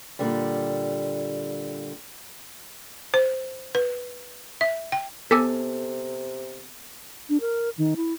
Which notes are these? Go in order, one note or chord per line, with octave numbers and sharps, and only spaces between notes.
A#2 D3 G3
C5
B4
E5
G5
C3 B3 A4 G#5 D6 E6
D4
A#4
D#3
E4